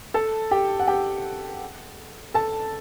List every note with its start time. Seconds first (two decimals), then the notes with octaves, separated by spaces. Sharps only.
0.14 A4 A5
0.51 G4 G5
0.80 F#5
0.88 G4 G5
2.34 A4 A5